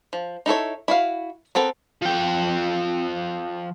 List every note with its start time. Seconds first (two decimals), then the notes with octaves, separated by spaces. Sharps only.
0.13 F3
0.46 D#4 E4 A4 C#5
0.88 E4 F#4 F5
1.55 B3 C4 A4 A#4
2.02 F3 G5